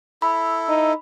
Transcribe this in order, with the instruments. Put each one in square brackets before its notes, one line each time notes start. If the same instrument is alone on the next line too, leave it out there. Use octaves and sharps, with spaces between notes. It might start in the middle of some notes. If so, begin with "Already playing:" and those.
[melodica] E4 A4 [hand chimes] B5
[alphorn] D#4